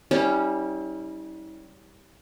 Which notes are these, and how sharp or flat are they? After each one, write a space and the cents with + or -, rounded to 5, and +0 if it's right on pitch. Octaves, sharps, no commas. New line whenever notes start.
G3 +0 C#4 +0 E4 -40